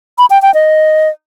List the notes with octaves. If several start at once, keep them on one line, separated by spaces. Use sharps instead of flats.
B5
G5
G5
D#5